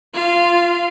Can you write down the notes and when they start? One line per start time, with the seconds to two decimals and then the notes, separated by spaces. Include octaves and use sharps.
0.14 F4 F5